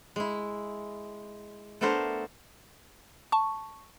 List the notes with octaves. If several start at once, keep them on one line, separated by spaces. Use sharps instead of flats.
G#3 E4
A3 B3 D4 A4 A#4 C5
A5 C#6